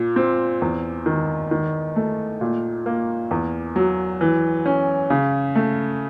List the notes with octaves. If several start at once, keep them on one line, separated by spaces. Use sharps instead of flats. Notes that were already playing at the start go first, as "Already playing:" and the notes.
Already playing: A#2
C4
E2
D#3
D#3
A3
A#2
A#3
E2
F#3
E3
C#4
C#3
A3